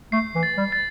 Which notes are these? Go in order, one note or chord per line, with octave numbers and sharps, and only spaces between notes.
A3 C7
E3
A6
G3
A6